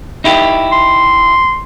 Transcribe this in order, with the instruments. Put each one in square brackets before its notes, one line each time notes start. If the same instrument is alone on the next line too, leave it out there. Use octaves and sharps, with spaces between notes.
[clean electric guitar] D#4 E4 G4
[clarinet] C6